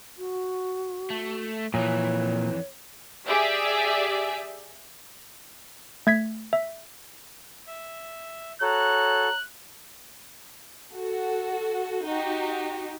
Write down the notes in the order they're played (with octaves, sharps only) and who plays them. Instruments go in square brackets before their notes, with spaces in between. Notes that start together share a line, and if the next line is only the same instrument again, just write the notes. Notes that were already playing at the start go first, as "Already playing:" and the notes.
[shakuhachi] F#4
[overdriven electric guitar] A3
[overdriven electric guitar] F2 E3 [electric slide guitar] A#2 [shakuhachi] C#5
[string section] G4 G#4 D5 E5
[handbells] A3 G#6 B6
E5
[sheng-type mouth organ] E5
[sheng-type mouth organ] F#4 A4 [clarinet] C#5 [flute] A#5 [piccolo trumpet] F#6
[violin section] F#4 A4
D#4 F#4 G4